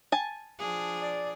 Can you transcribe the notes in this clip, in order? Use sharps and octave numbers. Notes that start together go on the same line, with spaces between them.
G#5 A5
F3 D4 G#4
D5